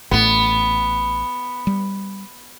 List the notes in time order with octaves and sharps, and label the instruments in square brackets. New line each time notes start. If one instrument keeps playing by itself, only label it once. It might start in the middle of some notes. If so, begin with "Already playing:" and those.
[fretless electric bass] A1 A2 [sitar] B3
[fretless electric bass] G3